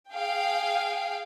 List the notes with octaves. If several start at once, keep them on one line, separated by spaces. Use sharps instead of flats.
G#4 F5 G5